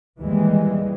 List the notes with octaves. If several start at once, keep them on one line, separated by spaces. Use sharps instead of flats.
D#2 E3 G3 G#3